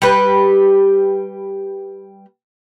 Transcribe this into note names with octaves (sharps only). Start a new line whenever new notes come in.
G3 G4 B4